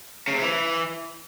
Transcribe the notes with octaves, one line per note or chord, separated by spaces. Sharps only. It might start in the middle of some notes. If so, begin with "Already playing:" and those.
C#3
C3
E3